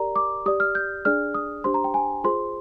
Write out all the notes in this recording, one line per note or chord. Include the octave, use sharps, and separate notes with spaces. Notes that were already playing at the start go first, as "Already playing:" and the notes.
Already playing: G4 A#4 D5 A#5
D6
G4 D5 D#6
F6
G6
D4 G#4 D5 F6
D#6
D4 G4 C5 C6
A#5
G5
G#5
F4 G#4 C5 C6